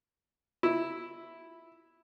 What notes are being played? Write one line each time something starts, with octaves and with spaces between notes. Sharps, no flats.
E4